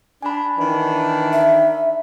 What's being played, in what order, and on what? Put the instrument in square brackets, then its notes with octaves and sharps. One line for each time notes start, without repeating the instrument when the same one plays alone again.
[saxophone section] D4 [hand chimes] G#5 B5
[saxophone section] D#3 E3 D4
[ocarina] E5